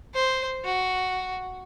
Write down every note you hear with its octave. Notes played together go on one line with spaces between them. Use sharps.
C5
F#4